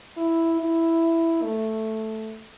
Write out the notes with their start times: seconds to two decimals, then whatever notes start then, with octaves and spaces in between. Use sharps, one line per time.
0.17 E4
0.60 E4
1.43 A3